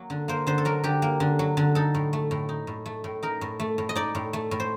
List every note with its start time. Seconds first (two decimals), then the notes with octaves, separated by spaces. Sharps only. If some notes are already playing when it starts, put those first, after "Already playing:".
Already playing: F#3 A#3
0.10 D3
0.28 A#3 C5
0.47 D3 C5
0.58 A4
0.65 F#3 A#4
0.84 D3 G4
1.02 A#3
1.20 D3
1.39 F#3
1.57 D3
1.75 D#4 A4
1.94 A2
2.13 A3
2.31 A2
2.49 D#4
2.67 A2
2.86 A3
3.04 A2
3.23 D#4 A#4
3.41 A2
3.60 A3
3.78 A2
3.89 D#5
3.95 D#4 D5
4.15 A2
4.33 A3
4.51 A2
4.60 C5